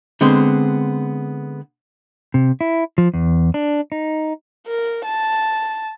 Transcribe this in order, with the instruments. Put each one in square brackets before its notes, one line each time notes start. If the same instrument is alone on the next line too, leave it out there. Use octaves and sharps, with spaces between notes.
[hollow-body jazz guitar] D3 G#3 B3 C4
[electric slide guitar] C3
E4
F3
E2
D4
D#4
[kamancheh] A#4
A5